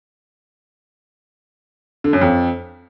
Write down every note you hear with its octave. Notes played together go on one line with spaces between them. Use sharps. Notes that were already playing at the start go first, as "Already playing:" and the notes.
D3
F#2
F2